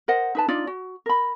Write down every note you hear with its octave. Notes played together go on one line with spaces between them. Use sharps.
A#4 C5 D#5 F#5
D#4 B4 A5
D4 D#4 F4 D5
F#4
A#4 B5